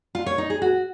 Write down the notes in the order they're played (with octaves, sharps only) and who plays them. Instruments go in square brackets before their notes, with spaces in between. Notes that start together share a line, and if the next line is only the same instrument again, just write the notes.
[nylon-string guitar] F4
C#5
D#4
G#4
F#4